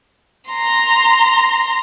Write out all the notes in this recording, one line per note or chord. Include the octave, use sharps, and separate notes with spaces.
A#5 C6